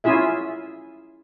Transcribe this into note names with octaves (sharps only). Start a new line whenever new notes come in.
C#4 E4 F4 G#4 E5